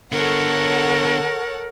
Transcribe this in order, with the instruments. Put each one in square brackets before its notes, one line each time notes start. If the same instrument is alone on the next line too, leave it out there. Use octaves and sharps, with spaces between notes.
[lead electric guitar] D3 B3 [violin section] A4 C#5 F#5 [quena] A#4